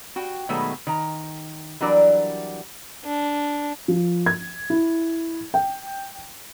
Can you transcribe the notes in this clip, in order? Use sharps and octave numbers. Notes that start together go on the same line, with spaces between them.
F#4 G5
B2 D#3 F#3 G#3 A3 B3
D#3 A#5
E3 F#3 G3 D4 A#4 D5
D4
F3
G#6
E4
G5